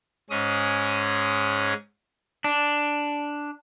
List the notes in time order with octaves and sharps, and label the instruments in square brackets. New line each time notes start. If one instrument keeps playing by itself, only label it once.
[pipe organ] G#2 G#3 C#4 D#6
[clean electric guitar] D4